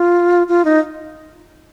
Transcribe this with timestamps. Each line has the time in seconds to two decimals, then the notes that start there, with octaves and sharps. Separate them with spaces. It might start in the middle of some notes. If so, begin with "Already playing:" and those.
Already playing: F4
0.49 F4
0.65 D#4